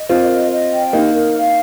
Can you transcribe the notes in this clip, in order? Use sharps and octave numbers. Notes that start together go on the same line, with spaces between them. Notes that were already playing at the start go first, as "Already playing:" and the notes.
Already playing: D#5
C4 F4 A#4
D#5
D#5
G5
A#3 D#4 G4
A#4
F5